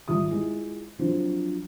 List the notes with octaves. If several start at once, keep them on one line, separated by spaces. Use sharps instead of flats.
G#1 G3 F4 G4 E5 D#6
G#3 E4 F4
F3 F#3 C4 D4